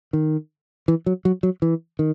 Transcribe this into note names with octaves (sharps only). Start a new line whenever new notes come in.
D#3
E3
F#3
F#3
F#3
E3
D#3